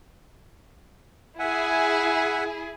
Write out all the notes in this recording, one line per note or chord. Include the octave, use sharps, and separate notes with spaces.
E4 G#4 E5 F#5 G#5